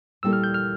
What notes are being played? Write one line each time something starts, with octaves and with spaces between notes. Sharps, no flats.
A#2 G3 A#3 E4 A4 E6
F6
G6
F6